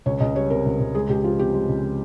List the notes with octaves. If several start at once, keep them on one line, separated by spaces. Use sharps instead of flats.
C#2 C#5
C#2 D#5
G3 C#5
C3 A#4
C#2
C#2
G#3 G#4
C#2 G4
F3 F4
C3 G4
G#3
C#2